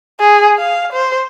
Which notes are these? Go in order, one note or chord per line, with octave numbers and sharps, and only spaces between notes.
G#4
F5
C5